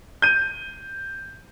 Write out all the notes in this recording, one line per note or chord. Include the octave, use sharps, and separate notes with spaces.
G6 D#7